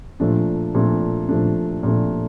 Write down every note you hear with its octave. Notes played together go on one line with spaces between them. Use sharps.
A#2 F3 A3 D4
A#2 F3 A3 D4
A#2 F3 A3 D4
A#2 F3 A3 D4